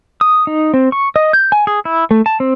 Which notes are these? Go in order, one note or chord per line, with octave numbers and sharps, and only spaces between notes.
D#6
D#4
C4
C#6
D#5
G6
G#5
G#4
E4
A3
A5
C4